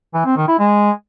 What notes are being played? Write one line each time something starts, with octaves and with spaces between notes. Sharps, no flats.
E3
C4
D#3
E4
G#3